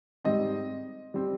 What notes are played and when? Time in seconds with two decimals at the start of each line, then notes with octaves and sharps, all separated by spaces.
0.24 G#2 G3 C4 D#5
1.14 G3 C4